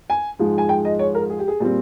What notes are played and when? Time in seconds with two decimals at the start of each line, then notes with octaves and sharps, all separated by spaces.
0.10 G#5
0.39 G#2 F3 G#3
0.58 G#5
0.69 G5
0.85 D#5
0.99 C#5
1.15 A#4
1.30 G#4
1.39 G4
1.48 G#4
1.60 A#2 G3 C4